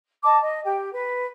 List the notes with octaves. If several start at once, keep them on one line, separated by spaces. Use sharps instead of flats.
D#5 A5 D6
D#5
G4 G5
B4